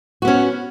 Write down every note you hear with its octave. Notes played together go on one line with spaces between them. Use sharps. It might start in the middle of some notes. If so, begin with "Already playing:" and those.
B3 C#4 F#4